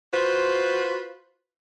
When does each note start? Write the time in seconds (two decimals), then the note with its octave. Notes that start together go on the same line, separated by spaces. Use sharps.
0.14 F4 F#4 B4 C5